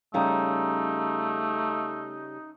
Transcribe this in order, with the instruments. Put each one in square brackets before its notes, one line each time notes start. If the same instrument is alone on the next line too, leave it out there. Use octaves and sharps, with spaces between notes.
[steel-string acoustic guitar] C#3 G3 C#4 [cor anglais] A3 [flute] D#4 [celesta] F5 A#5